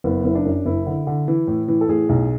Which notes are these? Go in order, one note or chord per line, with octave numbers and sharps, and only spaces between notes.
F#1 B3
F#1 E4
D4
F#2
F#1 E4
D3
D3
E3
A2
E3
A4
A2 G#4
B1